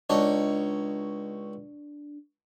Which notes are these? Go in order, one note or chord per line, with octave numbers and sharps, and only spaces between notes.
C#2 D4 D#4 C#5